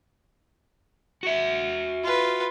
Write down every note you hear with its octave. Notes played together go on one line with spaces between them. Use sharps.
F#4 E5
F4 B4